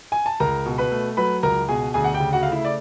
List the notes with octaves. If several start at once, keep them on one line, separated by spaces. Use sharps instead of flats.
G#5
A5
C#2 A#4 A#5
B2
B4 B5
A3
F#3 B4 B5
C#2 A#4 A#5
B2 G#4 G#5
D2 G#4 G#5
F#5
G4 G5
C#3
F#4 F#5
A3 F5
E4 E5
D5